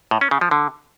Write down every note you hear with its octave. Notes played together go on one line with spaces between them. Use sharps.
A2
C#4
C#3
F3
D3